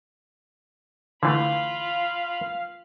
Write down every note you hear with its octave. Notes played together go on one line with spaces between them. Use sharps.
D3 E3 A3 F4 F5 B5